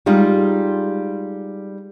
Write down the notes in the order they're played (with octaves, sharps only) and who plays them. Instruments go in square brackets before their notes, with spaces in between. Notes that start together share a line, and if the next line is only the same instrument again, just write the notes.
[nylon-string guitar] G3 G#3 D#4 F4